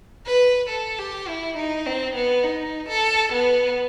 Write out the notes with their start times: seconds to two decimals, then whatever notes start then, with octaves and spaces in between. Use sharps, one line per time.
0.26 B4
0.69 A4
0.99 G4
1.28 E4
1.57 D#4
1.86 C4
2.15 B3
2.44 D#4
2.89 A4
3.32 B3